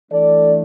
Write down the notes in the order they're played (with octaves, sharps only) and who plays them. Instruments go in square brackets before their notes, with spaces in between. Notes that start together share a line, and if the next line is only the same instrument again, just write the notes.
[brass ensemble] E3 A3 D4 A4 D5